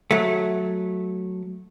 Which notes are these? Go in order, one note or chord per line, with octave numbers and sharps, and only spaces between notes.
F#3 A3